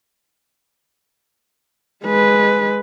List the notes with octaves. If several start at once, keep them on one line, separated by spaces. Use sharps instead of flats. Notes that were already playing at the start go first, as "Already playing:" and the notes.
G#3 B4